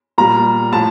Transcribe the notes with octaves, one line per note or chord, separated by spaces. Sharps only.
A#2 G3 A#5
A2 F3 A5